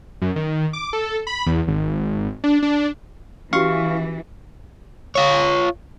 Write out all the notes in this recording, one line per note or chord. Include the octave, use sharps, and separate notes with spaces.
F#2
D#3
D6
A4
B5
E2
G#1
D4
D4
E3 C#4 F#4 G4 F5 C#6
F4 C#5